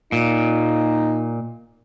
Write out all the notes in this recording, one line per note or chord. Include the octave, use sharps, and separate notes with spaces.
A#2 D#4